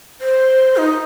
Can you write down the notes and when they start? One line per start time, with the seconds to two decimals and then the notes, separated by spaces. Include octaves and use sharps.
0.21 C5
0.77 D#4